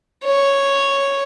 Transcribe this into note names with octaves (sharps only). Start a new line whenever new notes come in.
C#5